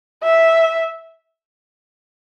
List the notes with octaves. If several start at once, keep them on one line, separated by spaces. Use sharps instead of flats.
E5